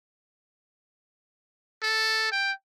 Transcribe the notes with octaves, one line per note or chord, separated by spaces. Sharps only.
A4
G5